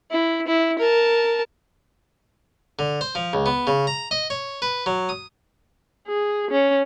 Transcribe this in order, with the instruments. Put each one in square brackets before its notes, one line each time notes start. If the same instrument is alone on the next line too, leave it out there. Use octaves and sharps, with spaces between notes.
[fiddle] E4
E4
A#4 A5
[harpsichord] D3
C5
F3
C#2
B3
C#3
A#5
D#5
C#5
B4
F#3
D#6
[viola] G#4
C#4